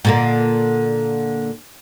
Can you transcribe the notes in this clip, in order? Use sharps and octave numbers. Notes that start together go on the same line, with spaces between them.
A#2 D3 A#3